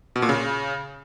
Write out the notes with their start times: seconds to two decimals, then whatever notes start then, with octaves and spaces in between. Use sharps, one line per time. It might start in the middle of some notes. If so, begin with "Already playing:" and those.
0.16 B2
0.22 A#2
0.29 C#3